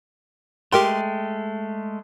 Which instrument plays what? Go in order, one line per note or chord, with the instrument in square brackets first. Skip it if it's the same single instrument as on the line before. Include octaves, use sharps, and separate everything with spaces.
[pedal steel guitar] G#3 A3 [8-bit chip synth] G4 A#4 C6 [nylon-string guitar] G5